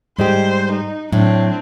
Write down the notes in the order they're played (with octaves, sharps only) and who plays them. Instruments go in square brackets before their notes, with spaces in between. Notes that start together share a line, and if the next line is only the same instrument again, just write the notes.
[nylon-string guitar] G#2 G#3 G4 [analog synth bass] G3 [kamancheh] C5
[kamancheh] D#4
[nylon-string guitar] A2 [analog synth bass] F#3 [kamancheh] C4 D4